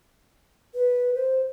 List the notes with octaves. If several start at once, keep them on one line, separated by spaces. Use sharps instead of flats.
B4
C5